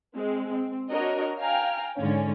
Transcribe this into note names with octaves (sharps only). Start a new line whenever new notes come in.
G#3 C4
C4
D4 F#4 A#4 C#5 D#5
F5 G5 G#5 A#5 F6
G#2 D3 C#4